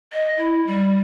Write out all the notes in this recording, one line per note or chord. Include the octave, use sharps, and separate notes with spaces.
D#5
E4
G3